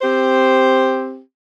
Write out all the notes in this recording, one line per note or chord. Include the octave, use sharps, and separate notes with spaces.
C4 G4 C5